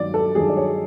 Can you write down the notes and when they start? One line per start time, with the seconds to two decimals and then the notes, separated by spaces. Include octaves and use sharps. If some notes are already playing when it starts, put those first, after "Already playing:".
Already playing: G2 D#3 F#3 D5
0.14 A4
0.35 G2 D#3 F#3 G#4
0.49 D5
0.57 C#5